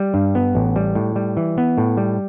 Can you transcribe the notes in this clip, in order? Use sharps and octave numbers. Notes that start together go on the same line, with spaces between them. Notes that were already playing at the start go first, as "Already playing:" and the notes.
Already playing: G3
G2
B3
A1
G3
A2
G3
E3
B3
A2
G3